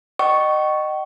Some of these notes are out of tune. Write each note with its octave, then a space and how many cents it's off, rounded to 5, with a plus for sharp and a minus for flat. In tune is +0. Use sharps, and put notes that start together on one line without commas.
D#5 -25 G5 -45 C#6 +0